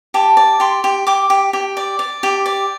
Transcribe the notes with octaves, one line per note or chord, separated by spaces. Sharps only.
G4 A5
D5
G4 C6
G4
G4 D6
G4
G4
D5
D5
G4
D5